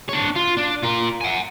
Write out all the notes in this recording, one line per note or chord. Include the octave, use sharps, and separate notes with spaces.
D4 C#5
F4
D4
F4 A#4
F#5 G#5